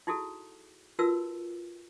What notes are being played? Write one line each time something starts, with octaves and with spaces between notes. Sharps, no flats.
D#4 E4 F#4 G#4 A4
D#4 F4 F#4 A#4 B4 E6